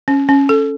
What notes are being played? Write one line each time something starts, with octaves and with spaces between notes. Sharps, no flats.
C#4
C#4
A4